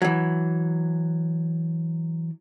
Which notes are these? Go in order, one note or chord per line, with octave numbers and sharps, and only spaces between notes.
E3 F#3